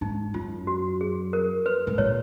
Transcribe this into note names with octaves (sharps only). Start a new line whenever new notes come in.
G#2 D#4
F#2 F4
F#4
G#4
A#4
B4
G#2
A#2 C#5